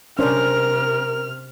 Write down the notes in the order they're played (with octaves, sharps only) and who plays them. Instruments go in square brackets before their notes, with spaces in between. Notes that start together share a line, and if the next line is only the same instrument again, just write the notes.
[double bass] C3 [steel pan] C#4 D4 C5 [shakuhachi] A#4 [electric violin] F6